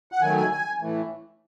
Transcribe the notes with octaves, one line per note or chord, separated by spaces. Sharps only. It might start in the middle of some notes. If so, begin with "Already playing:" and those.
F#5
D#3 F#3 A3 G#5
G#5
G#5
A2 E3 A3